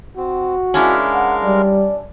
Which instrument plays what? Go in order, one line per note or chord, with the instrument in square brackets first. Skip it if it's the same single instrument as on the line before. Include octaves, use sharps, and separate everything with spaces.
[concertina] C4 [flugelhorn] F#4
[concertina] G#3 A#4 F5 [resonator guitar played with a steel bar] C#4 D4 E4
[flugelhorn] F#5
[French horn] G3 [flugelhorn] D5